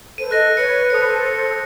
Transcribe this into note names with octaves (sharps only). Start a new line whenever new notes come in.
A4 B4 C5 D#7
A4 D#5 F#6 A#6 D#7
B4 C#5 C#7
A4 C5 D#6 C#7